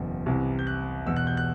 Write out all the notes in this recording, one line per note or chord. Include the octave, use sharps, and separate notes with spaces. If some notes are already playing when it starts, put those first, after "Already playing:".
Already playing: F#1 E2 B2
C2 C3 E3
G6
F#6
E1 E2 B2 E6
F#6
G6
F#6